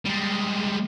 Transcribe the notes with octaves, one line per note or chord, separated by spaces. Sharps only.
G3 G#3